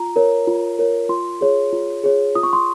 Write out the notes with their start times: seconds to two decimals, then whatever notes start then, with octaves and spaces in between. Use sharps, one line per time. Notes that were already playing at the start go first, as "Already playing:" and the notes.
Already playing: F4 A#5
0.16 A#4 C#5
0.47 F4
0.79 A#4 C#5
1.09 F4 C6
1.41 G#4 C#5
1.73 F4
2.04 G#4 C#5
2.35 F4 D#6
2.43 C#6
2.53 C6